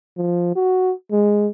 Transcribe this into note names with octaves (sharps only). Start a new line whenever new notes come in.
F3
F#4
G#3